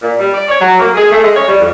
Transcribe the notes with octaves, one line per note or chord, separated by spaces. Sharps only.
A#2
G3
D5
C#5
F#3
A#3
G#4
A3
G#3
C#5
G3
F2